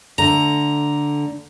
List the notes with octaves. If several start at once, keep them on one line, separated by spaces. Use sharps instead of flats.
D3 A3 A#5